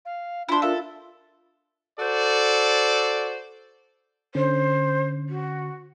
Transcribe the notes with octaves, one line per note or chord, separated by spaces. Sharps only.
F5
D4 E4 F4 C5
F4 A4 A#4 E5 F5
F#4 A4 C5 D5
D3 C#4 C5
F#4